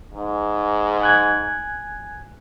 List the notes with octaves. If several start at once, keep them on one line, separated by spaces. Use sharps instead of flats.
G#2
G#5 F#6 G#6